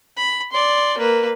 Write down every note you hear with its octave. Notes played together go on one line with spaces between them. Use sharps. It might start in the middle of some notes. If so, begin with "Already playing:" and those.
B5
D5 C6
A#3 B4